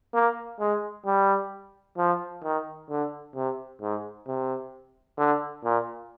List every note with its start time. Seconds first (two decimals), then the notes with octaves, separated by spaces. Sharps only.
0.14 A#3
0.60 G#3
1.06 G3
1.98 F3
2.43 D#3
2.89 D3
3.35 C3
3.81 G#2
4.27 C3
5.18 D3
5.64 A#2